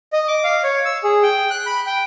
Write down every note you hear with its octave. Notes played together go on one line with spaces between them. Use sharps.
D#5
D6
F5
C#5
E6
G#4
G5
F#6
B5
G5